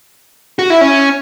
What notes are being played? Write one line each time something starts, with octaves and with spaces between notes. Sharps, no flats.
F#4
E4
C#4